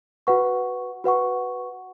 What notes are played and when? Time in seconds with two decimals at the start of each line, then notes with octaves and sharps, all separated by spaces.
0.27 F#4 B4 F#5 C#6
1.04 F#4 B4 F#5 C#6